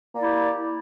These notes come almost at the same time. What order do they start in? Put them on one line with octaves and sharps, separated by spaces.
A#3 D5 E4 G4